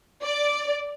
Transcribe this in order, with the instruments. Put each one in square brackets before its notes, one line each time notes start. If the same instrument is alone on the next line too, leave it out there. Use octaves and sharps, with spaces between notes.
[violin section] D5